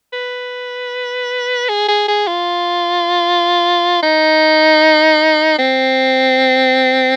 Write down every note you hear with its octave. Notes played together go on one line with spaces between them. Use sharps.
B4
G#4
G#4
G#4
F4
D#4
C4